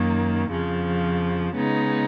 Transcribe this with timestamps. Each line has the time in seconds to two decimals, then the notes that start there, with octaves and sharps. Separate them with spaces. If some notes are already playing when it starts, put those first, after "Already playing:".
Already playing: F#2 D#3 A#3
0.50 F2 C#3 F3
1.55 C#3 G#3 B3 D#4